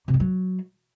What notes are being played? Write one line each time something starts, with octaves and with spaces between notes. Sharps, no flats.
C3
G#3
F#3